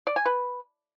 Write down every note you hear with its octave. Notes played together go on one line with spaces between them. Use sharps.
D5
G#5
B4